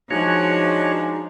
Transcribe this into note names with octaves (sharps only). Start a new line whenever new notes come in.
F3 G#3 D4 D#4 F#4 C#5